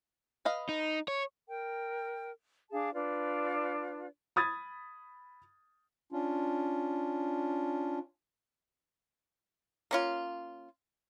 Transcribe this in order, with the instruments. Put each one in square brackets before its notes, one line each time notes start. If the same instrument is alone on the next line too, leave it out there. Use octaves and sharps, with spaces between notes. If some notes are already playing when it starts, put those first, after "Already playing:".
[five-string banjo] B4 D#5 F5
[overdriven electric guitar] D#4
C#5
[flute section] A#4 G5
D4 G#4 F5 A5
D4 F4 B4 D5
[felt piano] B5 D#6 G#6 A6
[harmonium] C#4 D4 F4
[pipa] A#3 C#4 F4